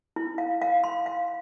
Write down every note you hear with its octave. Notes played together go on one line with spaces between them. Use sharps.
E4
F5
F5
C6
F5